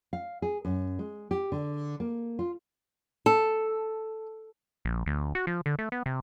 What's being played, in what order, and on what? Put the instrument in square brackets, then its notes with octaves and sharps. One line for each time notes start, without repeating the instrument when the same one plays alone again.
[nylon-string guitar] F5
G#4
F#2
G#3
G4
D3
A#3
F4
A4
[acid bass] A#1
D2
F#4
F3
D3
A3
B3
C3